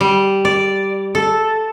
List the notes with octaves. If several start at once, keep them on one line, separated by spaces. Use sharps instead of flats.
G3
D5
A4